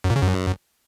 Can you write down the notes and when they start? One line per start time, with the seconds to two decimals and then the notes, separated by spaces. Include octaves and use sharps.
0.04 F#2
0.10 A#2
0.16 C#3
0.22 F#2